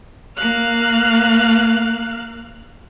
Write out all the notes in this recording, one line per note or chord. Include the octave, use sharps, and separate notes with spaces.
A#3 F5 F6 F#6